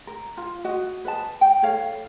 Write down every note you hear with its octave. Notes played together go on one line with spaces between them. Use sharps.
A#4
F4
F#4 D#5
B4 D#5 A5
G5
E4 A4 C#5 F5